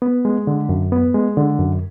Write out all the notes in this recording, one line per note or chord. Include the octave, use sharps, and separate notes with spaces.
B3
G#3
D3
F#2
B3
G#3
D3
F#2